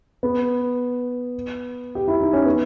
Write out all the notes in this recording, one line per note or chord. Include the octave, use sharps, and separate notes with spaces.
B3
G4
E4
D#4
C#4
B3